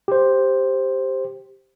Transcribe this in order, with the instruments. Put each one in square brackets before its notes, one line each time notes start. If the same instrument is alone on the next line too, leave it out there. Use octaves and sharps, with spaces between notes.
[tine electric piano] G4 C5